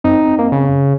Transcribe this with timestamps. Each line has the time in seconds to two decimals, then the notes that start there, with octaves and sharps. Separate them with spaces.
0.04 F#2 C4 D#4
0.39 A#3
0.52 C#3